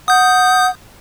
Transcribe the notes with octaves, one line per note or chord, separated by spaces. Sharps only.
F#5 D#6 G6